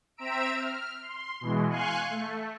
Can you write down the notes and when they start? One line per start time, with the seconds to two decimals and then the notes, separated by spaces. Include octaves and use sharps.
0.17 C4 E5 A#5 E6 D7
0.56 F6
1.02 C6
1.41 B2 E3 G#3
1.70 F5 G#5 C6 C#6 F#6
2.10 A3